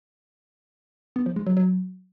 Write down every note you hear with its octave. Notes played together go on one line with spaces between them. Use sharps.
B3
F3
G#3
F#3
F#3